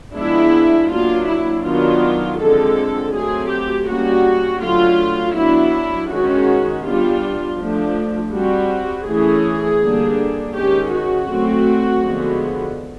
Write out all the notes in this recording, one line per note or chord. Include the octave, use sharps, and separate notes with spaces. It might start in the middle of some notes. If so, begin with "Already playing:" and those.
F3 G#3 B3 D4 E4
F#3 A#3 D4 F4
E4
D#3 F#3 B3 D4 F4
D3 F3 G#3 C4 A4
F#3 A3 C4 G#4
G4
G3 A#3 C#4 F#4
D3 F#3 A3 F4
F#3 B3 D4 E4
D#3 G#3 C#4 F#4
G3 B3 D4 F4
F3 A3 D4
G3 C4 F#4
E3 A3 C#4 G#4
D3 G3 A#3 D4
D#3 G#3 C#4 G4
F#4
F#3 A3 C4
D3 F3 G#3 B3